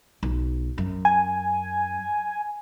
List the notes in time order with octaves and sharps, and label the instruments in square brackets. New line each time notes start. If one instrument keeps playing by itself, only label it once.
[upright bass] B1
F#2
[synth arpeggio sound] G#5